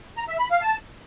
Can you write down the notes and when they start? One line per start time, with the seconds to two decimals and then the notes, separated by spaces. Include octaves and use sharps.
0.17 A#5
0.28 E5
0.39 B5
0.50 F5
0.62 A5